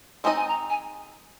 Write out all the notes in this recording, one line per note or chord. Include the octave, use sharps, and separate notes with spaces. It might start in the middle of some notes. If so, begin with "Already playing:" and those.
G#3 C4 D#4 A#4 D#5 G#5
G#5
A#5
G#5